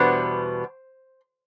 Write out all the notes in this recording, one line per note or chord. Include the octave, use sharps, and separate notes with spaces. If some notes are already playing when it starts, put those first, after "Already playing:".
Already playing: E2 B2 G3 B3 D4 C5